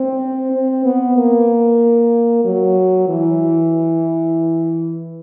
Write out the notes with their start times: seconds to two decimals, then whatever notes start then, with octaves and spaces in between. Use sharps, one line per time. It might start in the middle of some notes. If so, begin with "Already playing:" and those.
Already playing: C4
0.52 C4
0.84 B3
1.17 A#3
2.45 F#3
3.09 E3